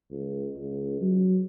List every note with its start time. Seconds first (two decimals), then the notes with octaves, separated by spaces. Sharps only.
0.11 C#2
0.57 C#2
1.01 F#3